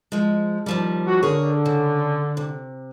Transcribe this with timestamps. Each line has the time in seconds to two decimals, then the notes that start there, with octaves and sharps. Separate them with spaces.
0.12 F3 G#3
0.66 D#2 F3 G3
1.07 F#4
1.23 D3 G#4 A#4 C#5
1.66 C#3
2.37 C3